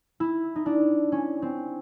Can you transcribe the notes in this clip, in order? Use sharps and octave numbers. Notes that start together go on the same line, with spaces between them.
E4
D#4
D4
C#4
C4